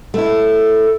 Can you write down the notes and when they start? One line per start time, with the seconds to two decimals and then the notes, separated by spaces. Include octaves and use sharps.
0.14 A3 E4